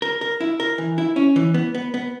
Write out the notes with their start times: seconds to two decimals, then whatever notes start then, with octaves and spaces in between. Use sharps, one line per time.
0.02 A#4
0.21 A#4
0.41 E4
0.60 A#4
0.78 E3
0.98 E4
1.16 C#4
1.36 E3
1.54 B3
1.75 B3
1.94 B3